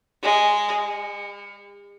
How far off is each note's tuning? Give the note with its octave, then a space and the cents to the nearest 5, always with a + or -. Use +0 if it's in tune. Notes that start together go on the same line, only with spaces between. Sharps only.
G#3 -5
G#3 -45